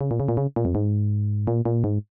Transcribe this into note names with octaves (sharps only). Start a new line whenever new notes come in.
C#3
A#2
C#3
A#2
C#3
A#2
F2
G#2
A#2
A#2
G#2